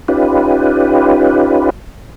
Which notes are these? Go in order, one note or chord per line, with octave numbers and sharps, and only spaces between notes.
C#4 D#4 F4 G4 B4